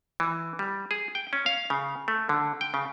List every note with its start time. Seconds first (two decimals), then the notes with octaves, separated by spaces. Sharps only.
0.20 E3
0.59 G3
0.91 G#4
1.15 G5
1.33 C#4
1.46 F5
1.70 C#3
2.08 A3
2.29 D3
2.61 G5
2.74 C#3